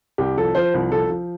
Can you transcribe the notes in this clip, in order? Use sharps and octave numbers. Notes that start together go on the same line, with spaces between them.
C2 G4
F3 A4
F3 C5
C2
F3 A4
F3